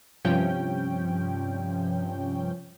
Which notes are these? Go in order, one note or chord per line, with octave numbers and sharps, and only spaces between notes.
G2 C3 F3 C#4 G5